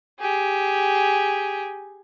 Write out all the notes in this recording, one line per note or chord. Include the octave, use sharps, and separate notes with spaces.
G4 G#4